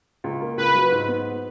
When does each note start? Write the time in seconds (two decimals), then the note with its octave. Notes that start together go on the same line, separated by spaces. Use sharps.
0.24 C#2
0.41 A#3
0.57 C#2 B4
0.75 F#3
0.92 G#2
1.08 B3